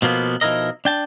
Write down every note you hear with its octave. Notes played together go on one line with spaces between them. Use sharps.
B2 F3 A#3 B3
B2 F3 D#4 E4 A#4 D#5
D4 G5 A5